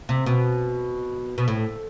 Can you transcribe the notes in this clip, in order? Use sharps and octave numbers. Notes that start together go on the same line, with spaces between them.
C3
B2
B2
A2